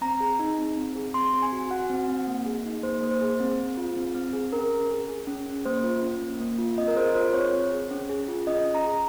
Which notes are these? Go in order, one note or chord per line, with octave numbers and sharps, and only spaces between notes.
C4 A#5
G#4
D#4
C4
C4
G#4
C4 C6
C4
G#5
F#4
F#4 F#5
C4
C4
A#3
G#4
D#4
A#3 C5
A#3
C5
G#4
C4
G#4
F4
C4
C4
G#4
C#4 A#4
C#4
G#4
G#4
C#4
C#4
A#3 C5
F4
C#4
A#3
A#3
F4
C4 D#5
A#4
G#4 C5
F4 C5
C4 C#5
C4
G#4
C#4
G#4
F4
C#4 D#5
C#4
A#5
G#4